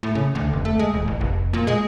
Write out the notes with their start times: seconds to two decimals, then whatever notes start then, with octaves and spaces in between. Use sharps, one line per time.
0.03 A2
0.15 C#3
0.35 D2
0.53 F1
0.65 A3
0.79 G#3
0.94 D#1
1.08 A1
1.21 F1
1.53 A#2
1.67 G#3